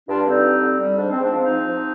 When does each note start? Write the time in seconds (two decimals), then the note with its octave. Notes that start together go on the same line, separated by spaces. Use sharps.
0.08 G2 D4 F4
0.26 D3 C4 D#4
0.44 G3
0.62 D3
0.80 G3
0.97 G#2 D4
1.11 C4
1.15 G#2
1.24 D4
1.33 F3 C4 D#4
1.50 F3
1.68 F3